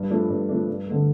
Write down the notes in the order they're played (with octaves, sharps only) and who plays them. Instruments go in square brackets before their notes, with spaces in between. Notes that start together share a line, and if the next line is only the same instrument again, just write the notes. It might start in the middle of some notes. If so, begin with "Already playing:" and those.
Already playing: [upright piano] G2
F3 A3 D4
G2
F3 A3 D4
G2
D3 A3